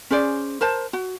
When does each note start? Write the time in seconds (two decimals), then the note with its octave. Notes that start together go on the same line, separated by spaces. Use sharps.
0.10 C#4 G#4 C5 D5
0.61 A#4 C5 A5
0.93 F#4